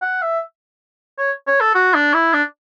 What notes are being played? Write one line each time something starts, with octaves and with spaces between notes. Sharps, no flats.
F#5
E5
C#5
C#5
A4
F#4
D4
E4
D4